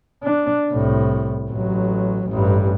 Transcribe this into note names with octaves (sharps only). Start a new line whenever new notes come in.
D4
C2 A2
A1 F#3
A1 G2